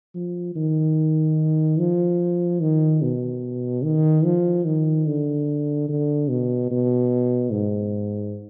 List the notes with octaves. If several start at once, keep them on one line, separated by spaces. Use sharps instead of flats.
F3
D#3
F3
D#3
B2
D#3
F3
D#3
D3
D3
B2
B2
G#2